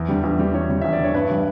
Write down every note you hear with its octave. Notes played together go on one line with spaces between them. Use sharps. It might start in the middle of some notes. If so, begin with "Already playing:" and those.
Already playing: E2
D3 G3
E2
D3 G3
E2 C#5
D3 G3
E2 E5
D5
D3 G3 C#5
G2 B4
E3 G3